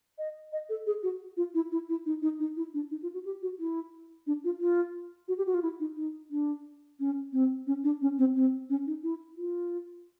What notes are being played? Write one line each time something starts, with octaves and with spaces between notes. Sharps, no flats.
D#5
D#5
A4
G#4
F#4
F4
E4
E4
E4
D#4
D#4
D#4
E4
D4
D#4
F4
F#4
G4
F#4
E4
D4
F4
F4
F#4
G4
F#4
F4
E4
D#4
D#4
D4
C#4
C4
C#4
D4
C#4
C4
C4
C#4
D#4
E4
F4